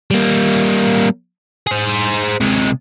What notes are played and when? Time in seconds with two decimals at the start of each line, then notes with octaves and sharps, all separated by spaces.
0.11 G3 A#3
1.67 G#4 C5
2.40 C3 G#3